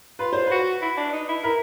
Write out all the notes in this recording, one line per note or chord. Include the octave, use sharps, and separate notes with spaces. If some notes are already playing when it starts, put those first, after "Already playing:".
F4 B4
C5
F#4 B4
E4
D4
D#4
E4
E4 A#4